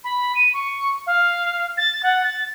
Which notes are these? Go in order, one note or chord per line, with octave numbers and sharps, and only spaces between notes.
B5
D#7
C#6
F5
A6
F#5
A6